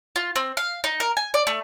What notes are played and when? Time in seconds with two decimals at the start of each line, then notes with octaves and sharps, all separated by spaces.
0.16 F4
0.36 C4
0.57 F5
0.84 D#4
1.00 A#4
1.17 G#5
1.34 D5
1.47 A3